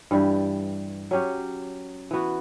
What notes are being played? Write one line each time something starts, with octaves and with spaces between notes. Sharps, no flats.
G2 E3 G3
F#3 C#4 G4
E3 B3 F#4